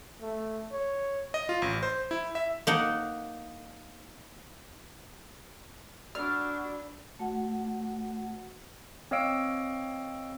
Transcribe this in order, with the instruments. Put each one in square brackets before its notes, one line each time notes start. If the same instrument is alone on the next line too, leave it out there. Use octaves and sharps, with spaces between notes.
[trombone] A3
C#5
[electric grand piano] D#5
F4
A1
C5
E4
E5
[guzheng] A#3 D#4 F#5
[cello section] D4 [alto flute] F#4 [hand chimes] D5 B5 E6 [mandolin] F6
[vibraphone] A3 F#4 F#5
[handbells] C4 C#5 D#5 F5 E6 D7